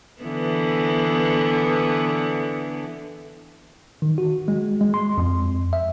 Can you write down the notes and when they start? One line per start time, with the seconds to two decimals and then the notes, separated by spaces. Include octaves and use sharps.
0.22 D3 E3 B3
4.02 D#3
4.18 F#4
4.48 G#3
4.81 G#3
4.94 C6
5.18 F2
5.73 E5